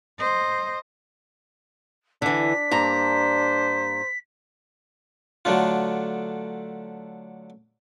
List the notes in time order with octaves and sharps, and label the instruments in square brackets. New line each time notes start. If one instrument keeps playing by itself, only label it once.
[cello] C5 D#5
[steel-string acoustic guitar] D3 E3 [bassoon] D4 [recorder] B6
[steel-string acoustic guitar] G2 A#3 A#5 [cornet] C5
[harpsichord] D3 F#3 A3 D4 F4